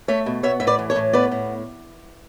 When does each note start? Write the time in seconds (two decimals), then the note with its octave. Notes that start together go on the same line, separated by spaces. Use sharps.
0.08 A3 C#5 E5
0.26 B2
0.43 B3 C#5 E5
0.60 A2 E5
0.67 B4 D5
0.79 E3
0.90 A4 C#5
0.96 A2
1.13 B3 B4 D5
1.31 A2